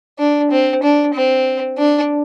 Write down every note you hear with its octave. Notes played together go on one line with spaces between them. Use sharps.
D4
C4
D4
C4
D4